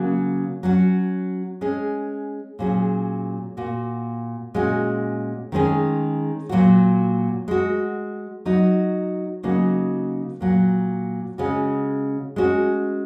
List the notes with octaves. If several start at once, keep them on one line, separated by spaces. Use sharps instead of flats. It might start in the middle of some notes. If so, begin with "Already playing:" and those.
Already playing: C#3 F#3 A#3
F#3 C#4 F#4
G#3 C#4 G#4
A#2 F#3 C#4 G#4
A#2 A#3 F#4
A#2 G#3 C#4 F#4
D#3 G#3 C#4 G#4
A#2 F#3 A#3 F#4
G#3 F#4
F#3 D#4 F#4
C#3 F#3 A#3 D#4 F#4
A#2 F#3 A#3
C#3 G#3 C#4 F#4
G#3 C#4 F#4